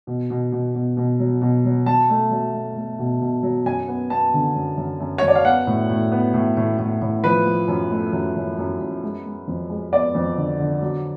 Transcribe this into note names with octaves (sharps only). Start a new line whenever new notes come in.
B2
B2
B2
B2
B2
F#3
B2
F#3
F#3 A5
A3
F#3
A3
A3
B2
B2
F#3
F#2 G#5
B3
B3 A5
D3
F#2
F#2
F#2
C#5
F#2
D5
F5
B3 F#5
A2
A2
B3
A2
A2
A2
A2
F3 B4
F3
F#2
A3
F#2
F#2
F#2
F#2
G#3
G#3
F2
G#3
B3 D5
F2
D3
D3
F#3